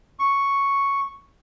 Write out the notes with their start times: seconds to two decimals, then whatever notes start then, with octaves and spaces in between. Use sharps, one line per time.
0.19 C#6